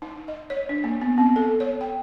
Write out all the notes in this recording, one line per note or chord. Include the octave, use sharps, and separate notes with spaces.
D#4
D#5
C#5
D4
A#3
B3
C4
A4
C#5
G5